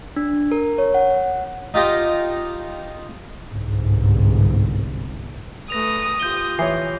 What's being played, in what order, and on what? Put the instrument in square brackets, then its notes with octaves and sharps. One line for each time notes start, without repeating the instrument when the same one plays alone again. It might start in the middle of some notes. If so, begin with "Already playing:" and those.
[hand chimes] D4
A#4
C#5
F#5
[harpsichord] D#4 F4 G4 D#5
[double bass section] G1 C2 G#2
[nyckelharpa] A3 B4 [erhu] D#6 [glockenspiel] A#6 F7
[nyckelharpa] F4 G4 [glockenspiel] G6 G7
[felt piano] E3 C#5 [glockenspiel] C7